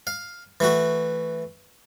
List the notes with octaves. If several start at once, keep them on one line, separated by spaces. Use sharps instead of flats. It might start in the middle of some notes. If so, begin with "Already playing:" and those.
F5
E3 A3 F#4